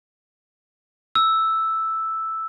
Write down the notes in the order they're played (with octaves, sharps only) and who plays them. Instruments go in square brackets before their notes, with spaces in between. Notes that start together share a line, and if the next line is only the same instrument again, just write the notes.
[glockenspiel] E6